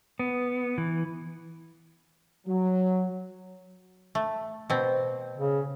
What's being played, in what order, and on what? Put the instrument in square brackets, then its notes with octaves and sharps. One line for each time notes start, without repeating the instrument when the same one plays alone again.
[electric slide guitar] B3
E3
[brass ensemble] F#3
[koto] A3
B2 C4
[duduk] C#3